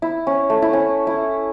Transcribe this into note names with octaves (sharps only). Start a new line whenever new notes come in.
E4
C#4
A3
E4
C#4
E4